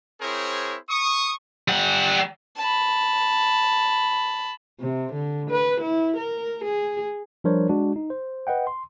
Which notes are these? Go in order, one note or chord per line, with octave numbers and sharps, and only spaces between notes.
C4 E4 G#4 A#4 C5 C#5
C#6 D#6
G3 F#5
A5 B5
C3
D3
B4
E4
A#4
G#4
F3 G3 D4 A#4 C5 C#5
G#3 D4 F#4
D#4
C5
B4 D#5 F#5 G5
C6